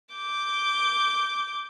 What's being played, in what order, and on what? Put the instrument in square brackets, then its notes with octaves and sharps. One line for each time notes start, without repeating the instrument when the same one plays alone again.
[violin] D6 G6